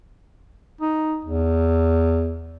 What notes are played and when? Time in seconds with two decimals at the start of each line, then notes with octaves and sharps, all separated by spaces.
0.81 D#4
1.25 E2